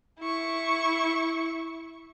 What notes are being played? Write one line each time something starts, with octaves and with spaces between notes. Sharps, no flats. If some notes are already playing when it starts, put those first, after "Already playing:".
E4 C#6